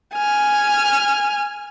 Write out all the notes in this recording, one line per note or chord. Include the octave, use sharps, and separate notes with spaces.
G#5 F6